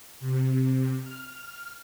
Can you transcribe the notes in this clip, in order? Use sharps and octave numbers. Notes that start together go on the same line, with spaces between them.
C3
F6